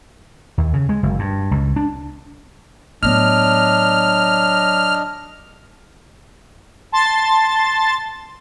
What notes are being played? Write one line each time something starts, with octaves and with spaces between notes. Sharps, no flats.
D#2
C#3
G#3
F#1
G2
C#2
D4
A2 F#3 B3 D4 D#5 F6
A5 C6 A6